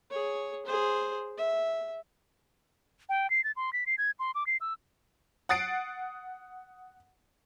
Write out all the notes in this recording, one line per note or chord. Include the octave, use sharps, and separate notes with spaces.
G#4 C#5
G#4 C5
E5
G5
C7
A6
C6
B6
C7
G#6
C6
D6
C7
E6
F#5 D#6 A6 C7 D7